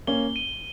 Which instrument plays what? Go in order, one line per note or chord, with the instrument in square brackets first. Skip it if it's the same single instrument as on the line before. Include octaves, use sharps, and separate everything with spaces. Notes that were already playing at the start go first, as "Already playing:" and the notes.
[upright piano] A#3 C#4 [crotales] G7
[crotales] D#7